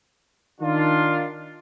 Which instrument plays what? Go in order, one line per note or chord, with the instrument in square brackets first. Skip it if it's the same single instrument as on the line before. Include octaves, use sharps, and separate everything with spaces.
[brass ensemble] D#3 D4 F4